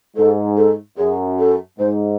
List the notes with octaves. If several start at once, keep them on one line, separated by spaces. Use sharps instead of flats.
G#2 A4
A4
F#2 G#4
A4
G#2 C5